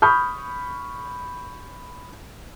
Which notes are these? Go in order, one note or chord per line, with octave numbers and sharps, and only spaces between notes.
B5 C#6 D#6 F6 G6